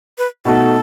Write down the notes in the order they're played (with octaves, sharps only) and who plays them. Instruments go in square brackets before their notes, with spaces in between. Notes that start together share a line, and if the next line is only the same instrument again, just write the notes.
[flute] B4
[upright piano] B2 A3 D#4 F#4 [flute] A4